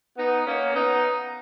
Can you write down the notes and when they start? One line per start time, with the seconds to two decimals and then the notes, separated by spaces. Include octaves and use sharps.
0.17 B3 D#4
0.46 A#3 C#4
0.74 B3 D#4